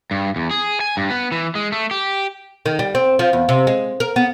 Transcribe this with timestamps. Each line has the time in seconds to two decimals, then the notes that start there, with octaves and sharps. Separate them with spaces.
0.11 G2
0.36 E2
0.51 G#4
0.81 G#5
0.97 G2
1.10 B3
1.32 E3
1.55 G#3
1.72 A3
1.91 G4
2.66 D#3
2.79 G3
2.95 C4
3.19 F3
3.33 E2
3.49 C3
3.67 G#3
4.00 A#4
4.16 B3